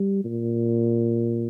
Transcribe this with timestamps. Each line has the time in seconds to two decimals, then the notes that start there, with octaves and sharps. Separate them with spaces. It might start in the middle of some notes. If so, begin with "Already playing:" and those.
Already playing: G3
0.24 A#2